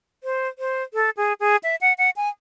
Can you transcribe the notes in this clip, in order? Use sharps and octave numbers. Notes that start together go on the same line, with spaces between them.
C5
C5
A4
G#4
G#4
E5
F#5
F#5
G#5